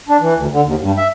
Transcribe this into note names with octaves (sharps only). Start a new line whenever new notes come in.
D4
E3
D2
D3
D#2
G2
E5